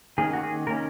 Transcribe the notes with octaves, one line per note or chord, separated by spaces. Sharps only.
D#3 A#3 C#4 G#4
F#4
G#4
D#3 A#3 C#4 A#4